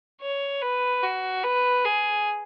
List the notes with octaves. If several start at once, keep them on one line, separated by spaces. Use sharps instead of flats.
C#5
B4
F#4
B4
G#4